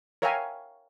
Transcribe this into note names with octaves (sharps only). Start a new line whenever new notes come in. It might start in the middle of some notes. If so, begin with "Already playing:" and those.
A#4 C#5 E5 F5 G5 G#5